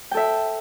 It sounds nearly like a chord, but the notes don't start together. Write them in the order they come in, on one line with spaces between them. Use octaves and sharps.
G5 A4 E5